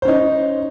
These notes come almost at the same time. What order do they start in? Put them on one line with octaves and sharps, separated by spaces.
C5 C#4 D#4